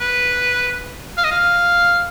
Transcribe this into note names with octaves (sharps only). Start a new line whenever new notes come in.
B4
F5
D#5
F5